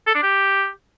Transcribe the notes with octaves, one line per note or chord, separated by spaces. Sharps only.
A4
D4
G4